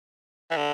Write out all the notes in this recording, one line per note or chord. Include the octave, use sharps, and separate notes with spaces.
E3
D3